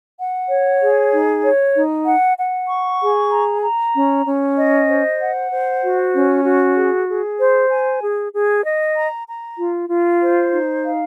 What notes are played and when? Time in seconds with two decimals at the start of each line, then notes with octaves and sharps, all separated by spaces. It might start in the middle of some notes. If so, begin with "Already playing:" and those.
0.18 F#5
0.50 C#5
0.81 G#4
1.12 D#4
1.44 C#5
1.74 D#4
2.06 F#5
2.37 F#5
2.68 C#6
3.01 G#4
3.31 A#5
3.62 A#5
3.94 C#4
4.25 C#4
4.57 D#5
4.88 C5
5.19 F#5
5.51 C5
5.83 F#4
6.14 C#4
6.45 F#4
6.76 G#4
7.07 G#4
7.39 C5
7.70 G#5
8.02 G#4
8.33 G#4
8.65 D#5
8.96 A#5
9.28 A#5
9.59 F4
9.90 F4
10.21 C5
10.52 D#4
10.84 F5